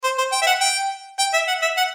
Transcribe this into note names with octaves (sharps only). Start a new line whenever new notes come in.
C5
C5
G5
E5
F#5
G5
G5
E5
F#5
E5
F#5